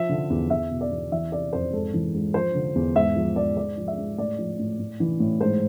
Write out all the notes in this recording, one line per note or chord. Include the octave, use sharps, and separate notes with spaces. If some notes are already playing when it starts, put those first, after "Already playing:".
Already playing: F3 E5
D3
E2
E2 E5
B2
D5
E2
E3 E5
C3 D5
F2 C5
G#2 A4
E3
G#2
F3 C5
D3
E2
G#2 E5
F3
G#2 D5
G#2 D5
F3
E5
G#2
A2 D5
F3
A2
A2
E3
A2
G#2 C5